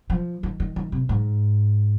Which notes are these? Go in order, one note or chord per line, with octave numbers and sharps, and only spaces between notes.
F3
D#3
D#3
D#3
C3
G#2